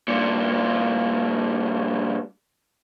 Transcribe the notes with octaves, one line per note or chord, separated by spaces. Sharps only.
G2 A#2